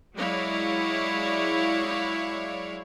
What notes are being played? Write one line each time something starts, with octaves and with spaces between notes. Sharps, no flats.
F#3 G#3 E4 C#5 D5 F5